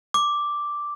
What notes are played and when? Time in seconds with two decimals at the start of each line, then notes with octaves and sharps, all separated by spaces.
0.14 D6